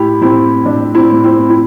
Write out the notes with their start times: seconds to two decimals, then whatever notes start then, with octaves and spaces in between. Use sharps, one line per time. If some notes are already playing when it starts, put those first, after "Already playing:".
Already playing: A2 E4 G4
0.22 A2 C4 E4
0.65 A2 D4
0.95 C4 E4
1.10 A2
1.24 C4 E4
1.50 E4